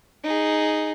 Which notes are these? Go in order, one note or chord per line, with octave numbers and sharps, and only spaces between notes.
D#4 G#4